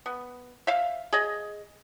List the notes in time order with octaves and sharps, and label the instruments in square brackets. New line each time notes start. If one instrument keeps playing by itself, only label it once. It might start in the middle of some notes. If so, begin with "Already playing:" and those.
[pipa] B3
E5 F5
G#4 D#5